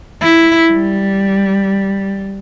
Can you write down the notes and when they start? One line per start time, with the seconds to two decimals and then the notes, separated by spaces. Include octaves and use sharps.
0.21 E4
0.72 G3